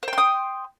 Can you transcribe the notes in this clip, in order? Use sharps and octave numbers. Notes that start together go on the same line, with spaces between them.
C5 G5 C6 D#6